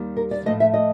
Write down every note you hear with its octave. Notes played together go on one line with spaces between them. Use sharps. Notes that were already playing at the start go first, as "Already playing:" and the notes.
Already playing: D#2 D#3 G3
A#4
D5
A2 F3 A3 D#5
E5
D#5